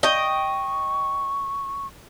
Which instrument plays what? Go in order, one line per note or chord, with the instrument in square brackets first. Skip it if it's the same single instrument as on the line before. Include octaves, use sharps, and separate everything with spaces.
[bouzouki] D#5 G5 [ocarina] C#6